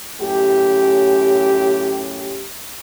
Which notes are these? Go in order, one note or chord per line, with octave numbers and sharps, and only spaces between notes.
F#2 A2 C#4 G4